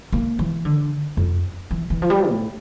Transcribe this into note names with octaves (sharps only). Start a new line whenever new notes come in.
A#3
E3
D3
F2
E3
E3
F3
G3
A2